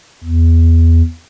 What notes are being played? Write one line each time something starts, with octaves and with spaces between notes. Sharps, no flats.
E2